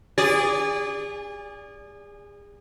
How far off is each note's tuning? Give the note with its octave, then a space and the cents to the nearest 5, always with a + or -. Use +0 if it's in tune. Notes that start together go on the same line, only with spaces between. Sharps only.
G#4 -30 D5 -15